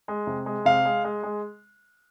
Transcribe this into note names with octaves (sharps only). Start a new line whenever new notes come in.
G#3
C3
G#3
C3 F5
G#3
G#3
G#3